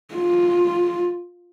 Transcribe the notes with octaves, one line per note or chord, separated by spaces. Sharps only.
F4